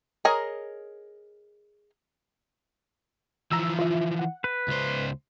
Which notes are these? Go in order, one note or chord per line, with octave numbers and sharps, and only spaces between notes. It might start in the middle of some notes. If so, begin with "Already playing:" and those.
G#4 A#4 C#5 D#5 A#5
E3 F3 A#5 E6
F4 E5
F#5
B4
C#2 C5